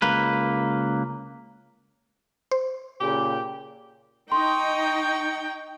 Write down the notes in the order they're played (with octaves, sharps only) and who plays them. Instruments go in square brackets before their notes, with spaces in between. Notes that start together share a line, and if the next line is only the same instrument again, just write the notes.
[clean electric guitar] C#2 A#3 B4
[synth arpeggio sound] C5
[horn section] A#2 C#3 G4
[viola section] D#4 [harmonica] D#5 C#6 [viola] G5 [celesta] C6